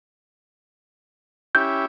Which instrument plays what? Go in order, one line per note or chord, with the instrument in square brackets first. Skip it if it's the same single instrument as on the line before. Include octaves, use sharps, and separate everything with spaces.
[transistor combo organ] C#4 E4 G4 [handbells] G6